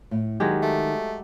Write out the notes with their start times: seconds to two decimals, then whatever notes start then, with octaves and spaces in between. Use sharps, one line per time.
0.11 A2
0.40 D#3 F#3 G#3 G4
0.63 A3